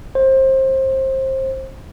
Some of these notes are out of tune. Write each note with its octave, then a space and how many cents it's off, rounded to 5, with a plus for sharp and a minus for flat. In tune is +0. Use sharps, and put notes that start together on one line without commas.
C5 +25